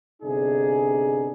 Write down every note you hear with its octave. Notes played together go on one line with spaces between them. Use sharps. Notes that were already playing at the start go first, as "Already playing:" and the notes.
G1 C3 D4 D#4 G#4